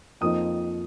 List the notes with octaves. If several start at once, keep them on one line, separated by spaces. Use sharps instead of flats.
F2 F3 A#3 D#4 D#6